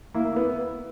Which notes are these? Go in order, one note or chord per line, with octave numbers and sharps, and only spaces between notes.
A#3 E4
B3